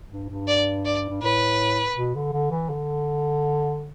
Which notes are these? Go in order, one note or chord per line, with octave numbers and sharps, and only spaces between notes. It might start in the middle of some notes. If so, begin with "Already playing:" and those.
G2
G2
D5
D5
G2
A2 B4
B2
D3
D3
E3
D3